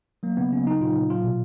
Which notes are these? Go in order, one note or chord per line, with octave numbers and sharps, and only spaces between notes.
F#3 A#3
C#3 B3
C#3 C#4
F#3 D#4
A#2 F4
A#2
F#3 F4
B2